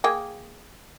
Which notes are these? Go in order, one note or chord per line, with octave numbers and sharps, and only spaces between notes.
A#3 G#4 G5